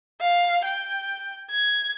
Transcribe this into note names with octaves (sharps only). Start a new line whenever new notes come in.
F5
G5
G#6